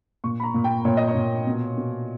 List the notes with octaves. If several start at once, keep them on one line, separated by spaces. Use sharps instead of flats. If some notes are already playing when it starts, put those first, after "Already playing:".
A#2 C#6
B5
A#5
A#2
G5
A#2 C#5
D#5
C#5
A#2
B2
B2